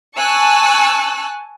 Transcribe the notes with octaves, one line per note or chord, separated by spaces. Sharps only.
G#5 A5 C#6 E6 F#6